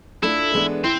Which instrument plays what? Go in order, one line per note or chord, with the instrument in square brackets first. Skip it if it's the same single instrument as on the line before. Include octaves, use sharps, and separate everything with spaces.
[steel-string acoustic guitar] A3 D4 F4 A4 [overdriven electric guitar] E4
[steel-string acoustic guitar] E3 G#3 B3 D4 A4
[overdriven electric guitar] C4 [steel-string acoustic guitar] E4